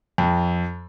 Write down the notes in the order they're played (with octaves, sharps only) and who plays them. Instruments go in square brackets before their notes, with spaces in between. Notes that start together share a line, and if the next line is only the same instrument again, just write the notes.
[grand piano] F2